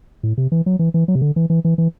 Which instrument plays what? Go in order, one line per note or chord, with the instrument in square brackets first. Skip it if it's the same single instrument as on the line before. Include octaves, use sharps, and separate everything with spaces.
[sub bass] A2
C3
E3
F#3
E3
E3
F#3
C3
D3
E3
E3
E3
E3